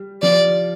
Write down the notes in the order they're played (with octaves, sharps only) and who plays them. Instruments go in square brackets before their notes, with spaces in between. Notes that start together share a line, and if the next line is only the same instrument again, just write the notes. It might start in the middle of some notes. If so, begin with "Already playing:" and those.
Already playing: [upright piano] G3
[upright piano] F3 [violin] D5